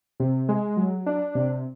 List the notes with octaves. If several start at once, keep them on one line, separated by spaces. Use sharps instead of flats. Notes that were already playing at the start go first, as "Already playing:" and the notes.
C3
G#3
F#3
D4
C3